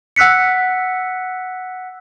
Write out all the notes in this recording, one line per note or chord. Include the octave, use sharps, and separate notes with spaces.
F#5 E6 F#6 B6 C#7